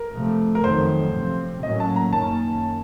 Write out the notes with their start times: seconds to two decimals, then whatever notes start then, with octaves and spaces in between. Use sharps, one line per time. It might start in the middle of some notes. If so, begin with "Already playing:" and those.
Already playing: A#4
0.13 C3 F3 A3
0.55 A#4
0.63 F2 D#3 F#3 A3 C5
1.13 C3 F3 C4
1.63 A2 F#3 A#3 C#4 D#5
1.80 A5
1.96 A#5
2.13 F#2 D#3 A#3 C#4 A5